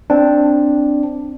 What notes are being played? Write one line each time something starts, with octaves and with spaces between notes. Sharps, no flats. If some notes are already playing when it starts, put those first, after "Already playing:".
C4 D4